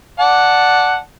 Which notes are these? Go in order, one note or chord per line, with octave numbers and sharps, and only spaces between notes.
D5 F#5 A5